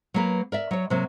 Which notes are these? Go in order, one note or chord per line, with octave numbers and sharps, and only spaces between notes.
F#3 A#3 B4
A#4 D5 E5
F#3 C#5
C3 F#3 A#3